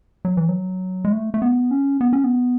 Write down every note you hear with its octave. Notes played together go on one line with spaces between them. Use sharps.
F#3
E3
F#3
G#3
A3
A3
B3
C#4
B3
C#4
B3